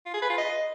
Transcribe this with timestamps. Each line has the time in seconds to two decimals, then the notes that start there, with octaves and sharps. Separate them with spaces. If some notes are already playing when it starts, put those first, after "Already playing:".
0.06 F4
0.14 G#4
0.22 B4
0.30 F4
0.38 D#5